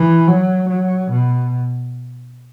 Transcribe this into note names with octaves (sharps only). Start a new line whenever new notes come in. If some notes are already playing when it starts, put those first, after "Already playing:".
Already playing: E3
F#3
F#3
B2